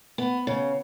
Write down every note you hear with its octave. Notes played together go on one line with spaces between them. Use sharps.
B3
C#3